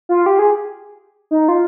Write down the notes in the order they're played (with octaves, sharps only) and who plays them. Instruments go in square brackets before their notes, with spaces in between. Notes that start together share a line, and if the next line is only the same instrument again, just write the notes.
[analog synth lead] F4
G4
G#4
D#4
F4